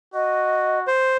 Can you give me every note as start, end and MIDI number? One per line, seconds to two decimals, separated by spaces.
0.14 0.87 66
0.14 0.79 75
0.87 1.17 72